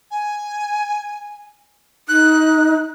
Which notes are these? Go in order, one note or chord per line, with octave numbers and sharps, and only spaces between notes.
G#5
D#4 F#6